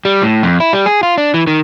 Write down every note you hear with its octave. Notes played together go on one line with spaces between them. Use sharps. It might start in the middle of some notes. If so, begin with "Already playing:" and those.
G3
A2
F2
E4
G3
G#4
F4
D4
E3
D#3